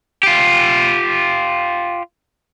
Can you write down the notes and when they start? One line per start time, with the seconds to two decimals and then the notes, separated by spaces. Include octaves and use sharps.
0.23 F4 G4